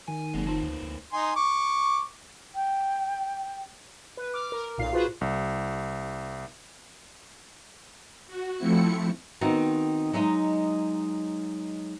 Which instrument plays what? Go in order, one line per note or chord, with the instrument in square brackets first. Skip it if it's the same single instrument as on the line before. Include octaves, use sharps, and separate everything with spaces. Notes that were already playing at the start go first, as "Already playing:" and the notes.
[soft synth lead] D#3 [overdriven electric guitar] G#5
[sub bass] F#1 [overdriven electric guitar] F#3 G#3 [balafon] A#3 C4
[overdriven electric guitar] A#3 C4 [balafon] D#4 F4 A5
[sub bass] D2
D2
[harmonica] D#4 G#5 C6
C#6 D6
[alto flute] G5
[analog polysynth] B4
D6 F6
A#4
B1 A#2 F5 C7
F4 F#4 G#4 B4 C5
[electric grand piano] C2
[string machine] F#4
F3 A3 C4 E4 C#7
[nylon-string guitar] D#3 B3 C4 D#4 F#4
F#3 G#3 D#4 D#5